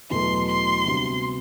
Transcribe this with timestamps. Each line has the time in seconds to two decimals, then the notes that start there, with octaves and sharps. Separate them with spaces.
0.10 E2 B2 F#3 A3 C6
0.47 C6
0.85 D2 C3 G3 B3 F#4